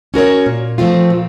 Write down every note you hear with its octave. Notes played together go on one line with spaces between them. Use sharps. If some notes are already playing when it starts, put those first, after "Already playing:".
C#4 F#4 A#4 C#5
A#2
F3 A3 C4 F4
A#2